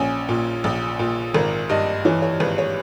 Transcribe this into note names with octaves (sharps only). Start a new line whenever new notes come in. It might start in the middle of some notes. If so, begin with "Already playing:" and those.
Already playing: A#1 C#4
A#2
A#1
A#2
G#1 A#4
G2 D#5
E3 C#5
C#5
G#1 B4
C#5